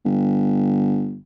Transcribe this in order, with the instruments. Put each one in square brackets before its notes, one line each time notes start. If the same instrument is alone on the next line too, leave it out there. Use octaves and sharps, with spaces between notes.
[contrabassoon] G1